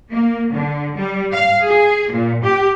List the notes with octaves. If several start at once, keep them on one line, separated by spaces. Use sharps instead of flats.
A#3
D3
G3
F5
G#4
A#2
G4